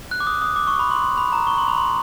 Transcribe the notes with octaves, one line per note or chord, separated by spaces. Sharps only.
F#6
D6
D#6
D#6
D6
C#6
B5
C6
C6
B5
A#5
C#6
C6
B5
C6